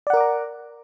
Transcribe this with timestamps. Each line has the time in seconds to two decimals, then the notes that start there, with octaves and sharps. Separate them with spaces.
0.07 D5
0.10 F#5
0.14 A#4
0.17 D6
0.20 A#5